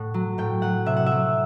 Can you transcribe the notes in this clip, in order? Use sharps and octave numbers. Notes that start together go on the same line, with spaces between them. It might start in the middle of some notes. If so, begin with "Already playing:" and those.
Already playing: A2 F#5
F#3
A2 G5
F#3 F#5
C3 E5
F#5
F#3 E5